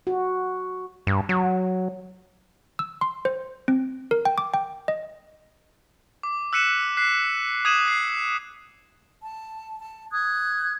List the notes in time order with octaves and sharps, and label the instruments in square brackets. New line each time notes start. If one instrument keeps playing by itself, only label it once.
[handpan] F#4
[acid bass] G2
F#3
[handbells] E6
C6
C5
C4
A#4
G5
D6
G5
D#5
[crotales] D6
E6 F#6 B6 C#7 D#7 E7
F#6 B6 C7
D#6 G#6 D#7 E7 F#7
C7
[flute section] A5
A5
D#6 F#6 G#6